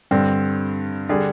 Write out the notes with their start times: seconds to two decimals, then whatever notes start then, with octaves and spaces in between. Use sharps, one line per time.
0.11 G2 D3 G3 C4
1.09 D3 G3 D4 G#4